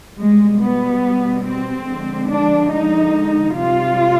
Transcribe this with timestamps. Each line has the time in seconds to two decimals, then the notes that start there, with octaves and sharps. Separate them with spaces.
0.18 B2 G3 G#3
0.61 B3
1.45 C4
1.88 D3 F3 G#3
2.30 D4
2.72 D#4
3.57 C3 G3 F4